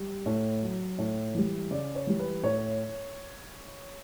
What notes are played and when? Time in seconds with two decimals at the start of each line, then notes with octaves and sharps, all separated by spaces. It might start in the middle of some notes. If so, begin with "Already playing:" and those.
Already playing: G3
0.26 A2
0.62 F#3
0.98 A2
1.35 E3 G3
1.71 C#3 D5
1.95 C#5
2.07 E3 G3
2.19 B4
2.43 A2 C#5